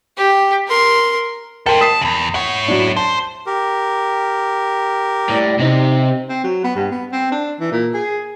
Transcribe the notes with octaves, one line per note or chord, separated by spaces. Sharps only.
G4
A#4 C6
A4 A#4 C5 G5 A5
A5 D#6 B6 C7
E2 C#3
E4 C#5 F#5
F#3 D4
C5 A5
G4 A#4
A2 G3
C3 C4 D#4
C4
F#3
B3
G2
B3
C4
D4
E3
A#2
G#4